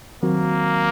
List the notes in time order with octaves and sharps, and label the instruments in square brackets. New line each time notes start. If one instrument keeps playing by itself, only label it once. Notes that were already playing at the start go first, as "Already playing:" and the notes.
[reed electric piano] D#3 F#3 C4 F#4 A#4 [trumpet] A#3